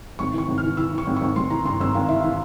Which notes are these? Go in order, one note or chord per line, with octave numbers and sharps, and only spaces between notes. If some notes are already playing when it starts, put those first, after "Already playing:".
G#1 C#6
E3 C#6
G#1
F6
E3
E3 E6
E3
C#6
G#1
C#6
G#1
G#1 C6
E3 A#5
G2 C6
G#1 E6
G#1 F5
E3 E5
E3 F5